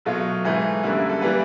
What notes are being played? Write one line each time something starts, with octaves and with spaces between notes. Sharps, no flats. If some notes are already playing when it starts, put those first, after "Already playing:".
B2 F#3 A3 F4
G#2 E3 A3
F#2 D3 G3 A#3 E4
E4
A4
E3 G3 A#3 B4